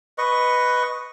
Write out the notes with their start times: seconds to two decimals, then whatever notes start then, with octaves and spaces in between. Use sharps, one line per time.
0.18 B4 D#5 C#6